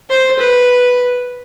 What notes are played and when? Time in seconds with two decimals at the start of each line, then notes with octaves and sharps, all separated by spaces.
0.10 C5
0.39 B4